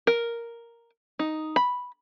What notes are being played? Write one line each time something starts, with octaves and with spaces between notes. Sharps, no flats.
A#4
D#4
B5